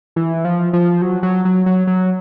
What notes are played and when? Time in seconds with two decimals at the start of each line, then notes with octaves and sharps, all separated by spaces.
0.16 E3
0.45 F3
0.73 F3
1.02 F#3
1.23 F#3
1.45 F#3
1.66 F#3
1.87 F#3